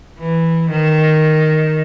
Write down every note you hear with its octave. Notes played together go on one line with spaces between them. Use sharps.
E3
D#3